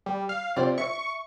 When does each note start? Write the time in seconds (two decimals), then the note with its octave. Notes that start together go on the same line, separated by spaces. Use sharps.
0.06 G3
0.29 F5
0.56 C3 F4 C5 D5
0.78 E5 C#6